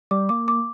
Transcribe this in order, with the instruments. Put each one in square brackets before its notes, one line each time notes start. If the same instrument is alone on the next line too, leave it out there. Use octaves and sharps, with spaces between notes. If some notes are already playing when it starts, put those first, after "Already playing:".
[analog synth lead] G3 [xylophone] D6
[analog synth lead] A#3 [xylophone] D6
[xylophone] D6